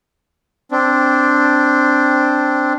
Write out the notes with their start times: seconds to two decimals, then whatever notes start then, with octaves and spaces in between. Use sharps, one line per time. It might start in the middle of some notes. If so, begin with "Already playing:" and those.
0.71 C4 D4